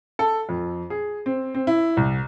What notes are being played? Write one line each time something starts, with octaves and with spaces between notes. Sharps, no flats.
A4
F2
G#4
C4
C4
E4
C2